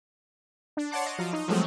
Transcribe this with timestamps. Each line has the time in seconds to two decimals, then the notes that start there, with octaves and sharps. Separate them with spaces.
0.77 D4
0.91 C#5 D5 F#5 A5 C6 D6
1.06 D#5 A#6
1.19 F3 F#3 F5
1.33 D#4
1.48 F3 F#3 G#3 A3 C4 F#4